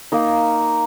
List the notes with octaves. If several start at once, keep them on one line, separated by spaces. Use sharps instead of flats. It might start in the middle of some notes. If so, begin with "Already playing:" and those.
A#3 D#4